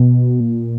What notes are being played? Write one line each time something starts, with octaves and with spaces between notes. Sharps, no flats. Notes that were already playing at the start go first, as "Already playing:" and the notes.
Already playing: B2
A#2